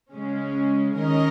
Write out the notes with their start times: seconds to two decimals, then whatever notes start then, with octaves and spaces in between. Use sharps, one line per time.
0.12 C#3 G#3 C#4
0.97 D#3 G#3 C#4 A#4 D#5